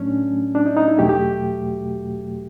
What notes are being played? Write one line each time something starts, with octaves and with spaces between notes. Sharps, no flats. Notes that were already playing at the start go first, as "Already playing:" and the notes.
Already playing: A2 F#3 A3 C#4 D4
D4
D#4
D#4
E4
E2 B2 F#3 A3 G4
G4